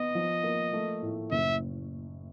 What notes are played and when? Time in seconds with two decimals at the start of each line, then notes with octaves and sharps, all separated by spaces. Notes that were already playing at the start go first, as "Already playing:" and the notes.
Already playing: B3 D#5
0.15 F3
0.43 A#3
0.73 A3
1.02 A2
1.31 F#1 E5